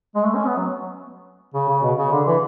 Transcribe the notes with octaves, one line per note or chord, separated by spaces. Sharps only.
G#3
A3
C#4
B3
F#3
C#3
C#3
B2
C#3
D3
E3